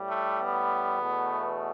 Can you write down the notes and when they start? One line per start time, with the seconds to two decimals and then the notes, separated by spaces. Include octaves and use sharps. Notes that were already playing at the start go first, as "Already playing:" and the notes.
Already playing: A2 G3
0.10 A3
0.40 B3
0.98 E2 B2 A3